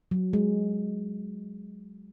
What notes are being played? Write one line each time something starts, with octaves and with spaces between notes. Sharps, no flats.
F#3
G#3